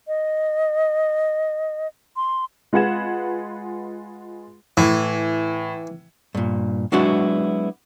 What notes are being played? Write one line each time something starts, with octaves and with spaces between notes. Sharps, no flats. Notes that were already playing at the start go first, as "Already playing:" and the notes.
D#5
C6
G#3 F4 B4 F#5 G#6 E7
A2 E3
G2 A#2
F#3 G#3 B3 D4 E4 F#4